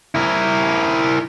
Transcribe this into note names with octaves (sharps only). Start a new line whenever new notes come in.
E4 A#4